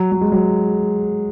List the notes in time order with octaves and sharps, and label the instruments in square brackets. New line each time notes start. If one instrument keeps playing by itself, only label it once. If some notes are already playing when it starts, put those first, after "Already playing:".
Already playing: [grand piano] F#3
F#3
G#3
F#3